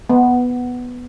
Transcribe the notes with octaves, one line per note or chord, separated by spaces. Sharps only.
B3